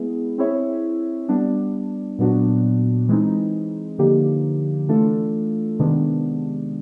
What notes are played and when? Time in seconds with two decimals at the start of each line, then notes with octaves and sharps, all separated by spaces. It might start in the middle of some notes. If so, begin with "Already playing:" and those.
Already playing: G#3 B3 E4 G#4
0.38 C4 E4 G#4 C#5 E5
1.29 G3 B3 D4
2.18 A#2 F#3 B3 D4 F#4
3.08 E3 G#3 C4 D#4
3.98 D3 F3 A#3 D#4 G4
4.89 E3 A3 D4 F4 A4
5.79 C3 D#3 G#3 B3 D4